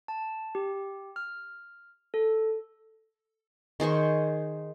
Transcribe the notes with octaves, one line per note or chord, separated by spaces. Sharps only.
A5
G4
F6
A4
D#3 G#4 C5 C#6